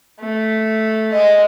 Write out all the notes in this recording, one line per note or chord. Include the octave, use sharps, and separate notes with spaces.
A3
G#3 D#5